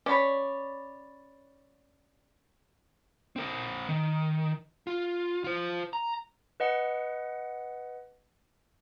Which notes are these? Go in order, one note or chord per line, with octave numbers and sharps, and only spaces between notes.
C#4 C#5 D5 B5
C4 A#4
D#3
F4
F4 C5
A#5
B4 D#5 F#5 C#7